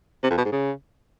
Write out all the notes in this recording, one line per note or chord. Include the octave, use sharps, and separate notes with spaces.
C3
F2
B2
G#2
C#3